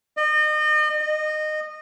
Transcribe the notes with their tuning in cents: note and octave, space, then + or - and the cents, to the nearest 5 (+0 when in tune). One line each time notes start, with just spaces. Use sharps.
D#5 -35
D#5 -20